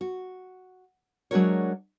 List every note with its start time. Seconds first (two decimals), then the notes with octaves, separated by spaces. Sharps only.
0.01 F#4
1.31 F#3 G#3 D4 F#4 A#4 C#5